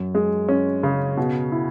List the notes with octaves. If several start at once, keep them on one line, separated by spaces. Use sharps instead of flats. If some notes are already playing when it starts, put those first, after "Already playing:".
Already playing: F#2
G#3
C#4
C#3
B2
E4